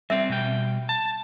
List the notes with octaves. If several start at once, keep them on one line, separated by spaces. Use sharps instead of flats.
G3 C4 E5
B2 G3 G5
A5